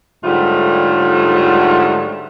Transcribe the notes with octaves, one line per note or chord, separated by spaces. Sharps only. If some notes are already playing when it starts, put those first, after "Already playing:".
G#2 D3 F#3 G3 A3 F4